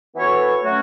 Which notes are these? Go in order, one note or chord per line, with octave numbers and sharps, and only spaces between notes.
E3 B3 F#4 A4 C#5
F#3 A3 C#4 F#4